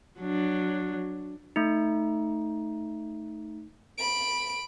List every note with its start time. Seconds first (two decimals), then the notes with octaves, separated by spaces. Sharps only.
0.20 F#3 D4
1.56 A3 D#4
3.98 B5 D7